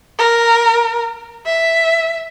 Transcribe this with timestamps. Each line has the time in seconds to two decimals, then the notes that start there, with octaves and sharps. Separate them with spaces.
0.18 A#4
1.46 E5